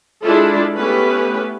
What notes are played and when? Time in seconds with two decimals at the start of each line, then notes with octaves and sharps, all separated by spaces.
0.23 G#3 D4 E4 F4 A4
0.75 A3 B3 C#4 E4 G4 B4